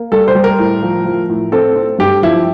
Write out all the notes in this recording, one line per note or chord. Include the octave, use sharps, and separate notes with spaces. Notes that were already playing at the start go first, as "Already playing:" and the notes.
Already playing: A#3
G3 A4
C5
G3
A#4
A2
F3
F3
A2
C4 A4
C4
G2 G4
F3 E4